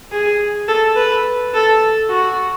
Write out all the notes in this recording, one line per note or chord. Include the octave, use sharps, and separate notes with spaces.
G#4
A4
B4
A4
F#4